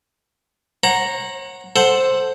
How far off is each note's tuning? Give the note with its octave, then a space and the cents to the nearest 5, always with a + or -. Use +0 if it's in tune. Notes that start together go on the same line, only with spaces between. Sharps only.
C#5 -40 F#5 +0 A#5 +0
A4 +0 C5 +5 F#5 +0